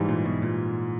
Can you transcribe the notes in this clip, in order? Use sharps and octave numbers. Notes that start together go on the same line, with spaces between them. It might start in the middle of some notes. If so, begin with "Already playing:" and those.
Already playing: G#2 E3 G3
A#2
B1 B2
A#2